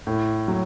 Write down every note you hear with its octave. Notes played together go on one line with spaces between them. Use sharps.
A2
F#3